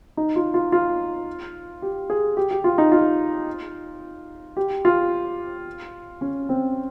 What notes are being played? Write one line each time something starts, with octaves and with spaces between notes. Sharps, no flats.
D#4
F4
F4
F4
G4
G#4
G4
G4
F4
D#4
F4
G4
F4
C#4
C4